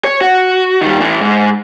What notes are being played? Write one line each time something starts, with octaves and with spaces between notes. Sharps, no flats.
C#5
F#4
D#3 G3
E3 A3
G#2